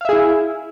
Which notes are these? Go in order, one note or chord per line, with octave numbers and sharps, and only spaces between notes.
E4 G#4 E5 F5